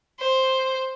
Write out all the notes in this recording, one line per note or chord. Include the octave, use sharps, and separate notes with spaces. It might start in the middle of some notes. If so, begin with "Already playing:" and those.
C5